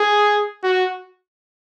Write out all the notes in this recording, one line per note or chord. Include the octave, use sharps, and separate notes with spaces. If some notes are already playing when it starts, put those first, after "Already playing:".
Already playing: G#4
F#4